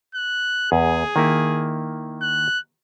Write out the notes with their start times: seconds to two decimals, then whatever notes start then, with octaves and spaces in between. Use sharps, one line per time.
0.15 F#6
0.72 E2 G#4
1.16 D#3 A#3 E4
2.22 F#6